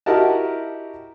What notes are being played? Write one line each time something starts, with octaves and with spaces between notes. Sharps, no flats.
E4 F#4 G4 A#4 D#5 A5